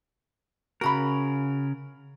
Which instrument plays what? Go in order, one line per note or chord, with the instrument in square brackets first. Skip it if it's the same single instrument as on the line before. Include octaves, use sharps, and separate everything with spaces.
[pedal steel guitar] C#3 A#4 [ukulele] F#4 A#5 B5